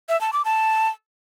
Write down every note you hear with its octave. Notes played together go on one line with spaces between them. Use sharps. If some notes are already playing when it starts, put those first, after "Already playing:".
E5
A5
D6
A5